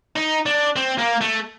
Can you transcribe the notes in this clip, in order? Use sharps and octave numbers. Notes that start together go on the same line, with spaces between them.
D#4
D4
C4
A#3
A3